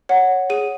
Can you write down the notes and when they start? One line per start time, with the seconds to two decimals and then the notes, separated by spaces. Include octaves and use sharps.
0.09 C#5 F#5
0.50 G#4 D#7